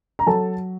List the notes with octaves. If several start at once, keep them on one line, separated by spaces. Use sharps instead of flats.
A#5
F#3 A4 A5